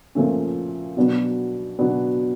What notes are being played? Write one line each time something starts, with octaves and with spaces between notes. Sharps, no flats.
A#2 F3 A3 C#4
B2 F#3 B3 D4
B2 F#3 B3 D4